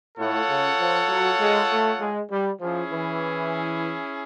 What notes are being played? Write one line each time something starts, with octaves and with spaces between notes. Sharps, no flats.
A2 F4 A4 C#5 F#5
C#3
F3
F#3
G#3
A3
G#3
G3
F3 C#4 E4 G#4
E3